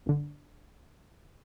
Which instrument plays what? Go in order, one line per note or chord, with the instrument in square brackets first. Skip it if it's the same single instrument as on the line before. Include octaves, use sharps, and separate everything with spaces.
[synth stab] G1 D3